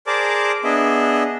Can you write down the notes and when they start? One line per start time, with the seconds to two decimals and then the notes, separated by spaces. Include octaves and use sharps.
0.07 G#4 A#4 C5 D5 A5 D6
0.64 B3 D4 G#4 D#5 E5